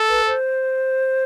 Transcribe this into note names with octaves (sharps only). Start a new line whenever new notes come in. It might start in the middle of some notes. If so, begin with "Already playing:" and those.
Already playing: A4
B4
C5